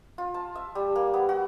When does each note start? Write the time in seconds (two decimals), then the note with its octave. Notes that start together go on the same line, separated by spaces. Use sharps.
0.18 F4
0.34 A5
0.56 E5
0.75 G3
0.96 A#3
1.14 B3
1.29 F#4